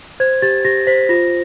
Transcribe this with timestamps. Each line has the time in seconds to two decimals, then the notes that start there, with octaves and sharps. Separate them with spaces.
0.20 C5 G#6
0.42 G4 A6
0.65 G4 A#6
0.87 C5 B6
1.09 F4 A#6